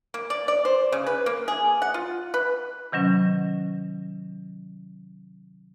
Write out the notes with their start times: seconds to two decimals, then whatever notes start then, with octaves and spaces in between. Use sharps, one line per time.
0.14 A#3
0.30 D5
0.48 D5
0.65 C5
0.92 C#3
1.07 B4
1.26 A#3
1.48 G#4
1.82 F#5
1.94 F4
2.34 B4
2.92 C3 D#3 F#3 C#4